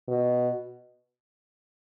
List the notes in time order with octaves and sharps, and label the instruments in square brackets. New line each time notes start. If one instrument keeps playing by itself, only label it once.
[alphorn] B2